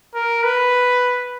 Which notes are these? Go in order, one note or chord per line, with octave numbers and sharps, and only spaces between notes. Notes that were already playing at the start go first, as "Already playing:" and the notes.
A#4
B4